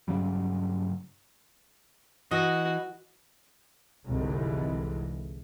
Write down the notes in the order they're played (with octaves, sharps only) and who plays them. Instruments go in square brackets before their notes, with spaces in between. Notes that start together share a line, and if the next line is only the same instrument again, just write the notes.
[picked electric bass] G2 C#3 F#3 G3
[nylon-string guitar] E3 [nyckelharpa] F#4 [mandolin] D#5
[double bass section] F1 C2 G#2 D3 E3 G#3